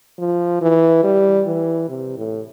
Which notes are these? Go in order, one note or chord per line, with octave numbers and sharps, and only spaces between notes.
F3
E3
G3
E3
C3
A2